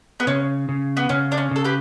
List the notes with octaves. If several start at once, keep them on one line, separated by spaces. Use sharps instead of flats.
B3
C#3 C#4
C#3
B3
C#3 C#4
D4
C#4
C#3 A4
G4 B4